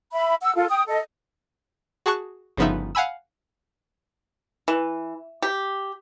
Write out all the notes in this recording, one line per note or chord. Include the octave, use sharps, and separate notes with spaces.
E5 B5
F#5 E6
F4 A4
G5 D#6
A4 D#5
F#4 G#4 A5 C#6 F#6
G1 C#3 F3 B3 D#4 E5
F5 F#5 G#5 B5 E6
E3
G4